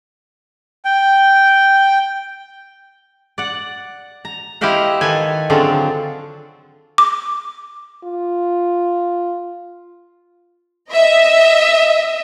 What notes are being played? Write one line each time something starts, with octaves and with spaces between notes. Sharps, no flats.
G5
D5 F#5
A#5
E4 G4 C5 D#5 F5 F#5
D#3 A4 B4 G#5
D3 F#3 C4 F4 G#4 A4
D6
F4
D#5 E5